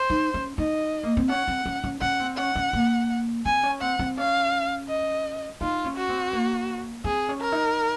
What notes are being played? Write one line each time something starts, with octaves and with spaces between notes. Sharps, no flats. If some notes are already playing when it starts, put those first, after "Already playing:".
Already playing: C5
D#4
C#4
D#4 D#5
A#3
C4
C#4 F#5
C4
C#4
C#4
C#4 F#5
C4
C#4 F#5
C#4
A#3
C4 G#5
C#4
C4 F#5
C4
C#4 F5
D#5
D#4 F4
C#4
F#4
C4
A#3
C4 G#4
C#4
A#4
D#4